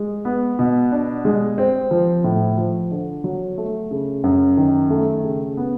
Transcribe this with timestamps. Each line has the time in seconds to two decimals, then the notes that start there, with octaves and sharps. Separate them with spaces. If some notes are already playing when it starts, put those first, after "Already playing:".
Already playing: G#3
0.25 B3
0.59 B2
0.92 D4
1.25 G#3
1.58 C4
1.91 F3
2.24 A2
2.58 F3
2.91 D3
3.24 F#3
3.58 A3
3.91 C#3
4.24 F#2
4.57 D#3
4.90 A3
5.24 C#3
5.57 B3